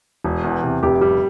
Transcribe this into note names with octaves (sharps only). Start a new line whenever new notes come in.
E1
E2
C3
F1 G4
G3 G4